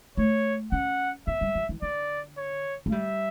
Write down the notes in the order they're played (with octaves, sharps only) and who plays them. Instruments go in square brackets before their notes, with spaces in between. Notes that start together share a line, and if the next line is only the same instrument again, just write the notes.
[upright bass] A3 [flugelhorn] C#5
[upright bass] C#4 [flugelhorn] F#5
[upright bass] B3 [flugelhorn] E5
[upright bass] G3
F#3
E3
[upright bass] D3 [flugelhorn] D5
[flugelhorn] C#5
[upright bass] A3
[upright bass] G3 [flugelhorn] E5